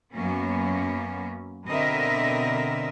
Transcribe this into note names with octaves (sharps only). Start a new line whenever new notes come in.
F#2 F#3 A#3 B3 C#4
B2 D3 C4 A#4 D#5 E5